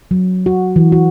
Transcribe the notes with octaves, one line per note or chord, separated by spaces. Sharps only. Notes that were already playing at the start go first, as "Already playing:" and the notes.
F#3
F#4
E3
F#4